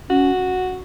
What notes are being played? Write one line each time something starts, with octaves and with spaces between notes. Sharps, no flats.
C#4 F#4